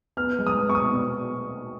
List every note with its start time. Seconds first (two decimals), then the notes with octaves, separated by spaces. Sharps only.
0.17 B3 F6
0.39 G#3
0.47 D#6
0.60 B3
0.69 C#6
0.75 D#6
0.82 B2